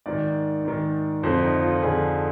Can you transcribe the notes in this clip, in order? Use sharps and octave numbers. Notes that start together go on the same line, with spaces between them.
G#2 D#3 D5
G#2 D#3
F2 D3 C5
D#4
F4
F2 D3 G#4